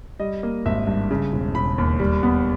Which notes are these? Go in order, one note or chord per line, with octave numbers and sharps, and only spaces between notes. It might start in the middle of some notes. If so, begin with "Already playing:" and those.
G3 D#5
A#3
G#1 E5
G2
C#3
E1
E1 B5
D#2
G3
B3